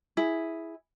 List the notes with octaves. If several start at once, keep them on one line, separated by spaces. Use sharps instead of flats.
E4 G#4